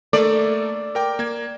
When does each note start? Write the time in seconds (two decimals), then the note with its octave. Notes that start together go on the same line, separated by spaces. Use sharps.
0.13 A3 A#3 A4 D5
0.95 A#4 G5 D6
1.19 A#3 G#6